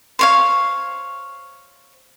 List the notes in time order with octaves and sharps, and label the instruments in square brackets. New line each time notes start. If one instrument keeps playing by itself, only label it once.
[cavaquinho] C5 C#5 F5